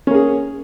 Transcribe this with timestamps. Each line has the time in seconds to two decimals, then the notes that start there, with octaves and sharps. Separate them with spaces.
0.07 C#4
0.11 A#3
0.14 G#4